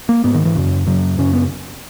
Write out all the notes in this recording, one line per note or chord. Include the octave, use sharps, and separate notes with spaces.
A#3
G#2 B3
D#3
E3
F#2 C#3
F#2 C#3 F#3
F#2 C#3 C#4
B3